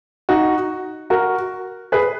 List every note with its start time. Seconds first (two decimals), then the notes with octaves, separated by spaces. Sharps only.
0.29 D#4 F#4
1.10 F#4 A#4
1.92 G#4 B4